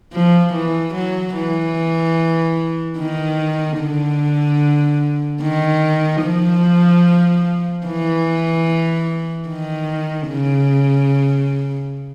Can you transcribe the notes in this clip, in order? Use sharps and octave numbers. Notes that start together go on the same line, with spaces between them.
F3
E3
F#3
E3
D#3
D3
D#3
F3
E3
D#3
C#3